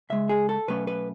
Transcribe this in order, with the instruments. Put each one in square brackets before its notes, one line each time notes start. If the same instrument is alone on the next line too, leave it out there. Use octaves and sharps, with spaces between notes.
[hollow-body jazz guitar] C#2 C#3 G#3 E5
G#4
A4
B2 F#3 A3 C#4 B4
B4